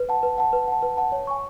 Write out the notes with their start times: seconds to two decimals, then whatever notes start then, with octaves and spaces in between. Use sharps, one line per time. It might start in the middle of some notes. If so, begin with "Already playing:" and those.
Already playing: B4
0.09 F#5 A5
0.23 B4
0.38 F#5 A5
0.53 B4
0.68 F#5 A5
0.82 B4
0.97 F#5 A5
1.12 C#5
1.27 G#5 C#6